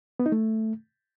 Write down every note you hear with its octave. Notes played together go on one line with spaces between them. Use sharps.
B3
D#4
A3